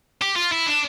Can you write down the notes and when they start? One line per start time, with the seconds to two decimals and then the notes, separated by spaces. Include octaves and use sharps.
0.22 G4
0.36 F4
0.52 E4
0.66 D4